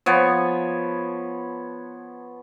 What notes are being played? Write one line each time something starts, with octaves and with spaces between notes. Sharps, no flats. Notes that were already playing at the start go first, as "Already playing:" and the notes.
F3 B3 C#5